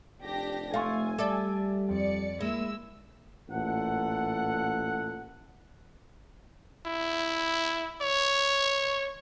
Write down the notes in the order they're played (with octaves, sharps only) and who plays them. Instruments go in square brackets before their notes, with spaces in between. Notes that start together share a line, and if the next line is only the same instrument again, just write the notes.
[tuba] F1 [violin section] D4 G4 A#6
[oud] A3 [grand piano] F5 C6 C#6 [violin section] G#5
[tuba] G3 [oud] A4 [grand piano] D5 E5 D6
[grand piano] F2 [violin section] D5 C#7
[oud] G#3 [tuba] A#3 [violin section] E4 E6
[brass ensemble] A1 A#2 A4 F#5
[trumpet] E4
C#5